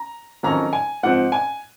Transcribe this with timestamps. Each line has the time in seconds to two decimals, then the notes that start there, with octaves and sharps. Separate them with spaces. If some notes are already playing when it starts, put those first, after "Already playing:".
Already playing: A#5
0.43 F2 D#3 F#3 C#4 A#5
0.73 G#5
1.03 G#2 F3 C4 F#5
1.32 G#5